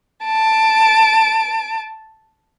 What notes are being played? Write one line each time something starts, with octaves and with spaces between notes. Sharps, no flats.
A5 D7